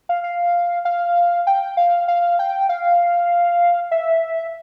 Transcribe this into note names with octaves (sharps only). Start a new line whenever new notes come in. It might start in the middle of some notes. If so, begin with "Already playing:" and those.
F5
F5
F5
G5
F5
F5
G5
F5
E5